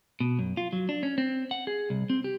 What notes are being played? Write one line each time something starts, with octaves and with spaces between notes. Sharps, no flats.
B2
F#2
F4
F#3
D4
C#4
C4
F#5
G#4
C2
C4
G4